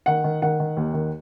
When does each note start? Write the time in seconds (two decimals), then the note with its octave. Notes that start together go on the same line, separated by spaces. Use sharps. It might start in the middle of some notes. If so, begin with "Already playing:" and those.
0.06 D#3 F#5
0.24 D#3
0.42 D#3 F#5
0.60 D#3
0.77 D#2
0.94 D#3